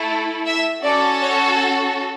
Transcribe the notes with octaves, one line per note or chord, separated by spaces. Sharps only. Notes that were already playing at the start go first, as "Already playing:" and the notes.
Already playing: A3 E4 A4
E5
C#4 F#4 A4 D5
C#5